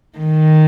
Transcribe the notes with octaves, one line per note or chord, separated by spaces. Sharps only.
D#3